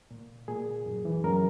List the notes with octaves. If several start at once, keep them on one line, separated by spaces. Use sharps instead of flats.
A#2
A#2 G#4
F#2
E3
F#2 A#4